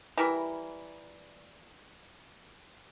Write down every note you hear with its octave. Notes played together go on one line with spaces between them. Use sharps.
E3 G3 E4 A#4